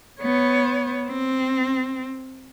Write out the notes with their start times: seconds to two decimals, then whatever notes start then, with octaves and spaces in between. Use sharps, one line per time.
0.21 B3 C#5
1.08 C4